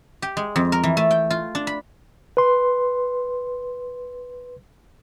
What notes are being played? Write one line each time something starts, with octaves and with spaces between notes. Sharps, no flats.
G4
G#3
F2
A#4
E3
A3
G5
F4
D4
B5
B4 C6